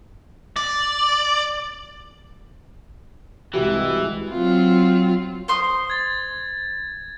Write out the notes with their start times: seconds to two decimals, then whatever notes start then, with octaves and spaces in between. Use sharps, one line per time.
0.56 D5
3.54 C2 E3 G#3 F#4 G4
4.31 F#3 C4 F4
5.48 C5 C6 D#6
5.90 G#6 A6